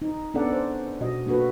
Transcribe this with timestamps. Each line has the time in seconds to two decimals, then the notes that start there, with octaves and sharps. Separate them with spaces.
0.02 D#4
0.34 B3 C#4 D4 A4 D5 F#5
0.52 C5
1.01 B2 F#4 D#5
1.26 A#3 D4 F#4 A4 B4